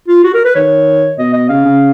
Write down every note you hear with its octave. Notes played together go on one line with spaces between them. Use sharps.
F4
F#4
A#4
B4
D#3 C#5
B2 D#5
D#5
C#3 F5
C#3